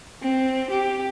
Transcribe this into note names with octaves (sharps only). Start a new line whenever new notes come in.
C4
G4